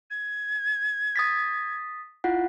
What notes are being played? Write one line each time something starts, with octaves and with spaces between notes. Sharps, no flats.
G#6
D#6 A6 B6
E4 F4 F#5